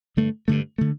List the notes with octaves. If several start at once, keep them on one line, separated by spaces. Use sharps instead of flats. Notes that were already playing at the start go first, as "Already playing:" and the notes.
G2 D3 A3
G2 D3 A3
D3 A3